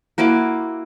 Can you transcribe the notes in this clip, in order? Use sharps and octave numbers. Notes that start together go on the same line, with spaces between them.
A#3 E4 F#4 D6